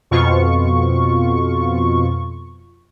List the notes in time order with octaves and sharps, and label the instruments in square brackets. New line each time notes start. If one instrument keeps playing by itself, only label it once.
[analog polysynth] F2 B2 F4 C#6